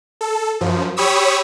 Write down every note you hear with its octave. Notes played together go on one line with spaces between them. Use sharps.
A4
F#2 F3
G4 C#5 B5 C#6 D#6 E6